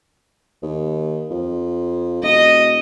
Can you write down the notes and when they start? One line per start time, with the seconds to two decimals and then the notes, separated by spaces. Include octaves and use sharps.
0.62 D#2
1.30 F2
2.23 E1 D#5